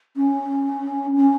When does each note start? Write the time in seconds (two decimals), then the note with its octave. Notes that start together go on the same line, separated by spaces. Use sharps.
0.16 C#4
1.16 C#4